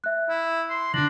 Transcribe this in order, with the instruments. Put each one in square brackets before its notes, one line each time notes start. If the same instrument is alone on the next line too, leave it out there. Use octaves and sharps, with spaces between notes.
[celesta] E5 F#6
[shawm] E4
C6
[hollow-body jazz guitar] D3 D#3 [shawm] D4 [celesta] A#6 F#7